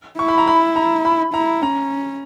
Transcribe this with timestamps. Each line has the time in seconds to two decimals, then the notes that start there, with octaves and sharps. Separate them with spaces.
0.19 E4 C#6
0.28 B5
0.38 A#5
0.47 B5
0.76 A#5
1.05 B5
1.34 E4 A#5
1.62 C#4 A#5